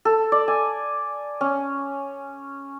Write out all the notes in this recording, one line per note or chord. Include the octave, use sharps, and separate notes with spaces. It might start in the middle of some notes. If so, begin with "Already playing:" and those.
A4
D5
G#5
C#4